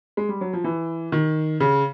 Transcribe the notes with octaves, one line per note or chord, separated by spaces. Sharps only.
G#3
G3
F#3
F3
E3
D#3
C#3